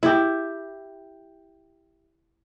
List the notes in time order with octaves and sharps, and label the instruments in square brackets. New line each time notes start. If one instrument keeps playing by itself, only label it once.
[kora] E4 G4